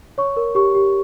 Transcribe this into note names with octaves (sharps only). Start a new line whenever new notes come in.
C#5 C#6
A#4
G4 C#6
G4